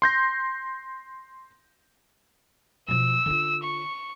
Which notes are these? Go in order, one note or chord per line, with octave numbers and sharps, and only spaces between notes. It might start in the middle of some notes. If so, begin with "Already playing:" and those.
C6 G6 A#6
B2 F3 E6
D3 F4
C#6